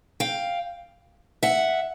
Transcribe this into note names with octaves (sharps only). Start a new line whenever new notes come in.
F5 G5
E5 F#5